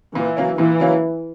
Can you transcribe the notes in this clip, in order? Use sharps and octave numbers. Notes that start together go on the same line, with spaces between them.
A#2 E3
F#3 A#3 C#4
A#2 E3
F#3 A#3 C#4